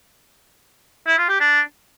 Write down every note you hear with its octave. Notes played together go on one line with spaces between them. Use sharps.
E4
F4
G4
D4